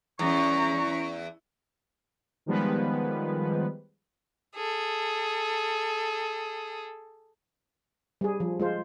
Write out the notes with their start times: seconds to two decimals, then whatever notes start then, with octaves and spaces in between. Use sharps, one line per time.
0.19 E2 C#4 A#5 C#6
2.46 D#3 F3 G3 G#3 B3 B4
4.55 G#4 A4
8.21 G3 G#4
8.40 F3
8.60 G#3 F4 C5